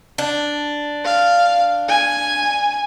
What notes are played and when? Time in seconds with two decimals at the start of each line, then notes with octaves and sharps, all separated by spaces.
0.18 D4
1.05 F5
1.88 G#5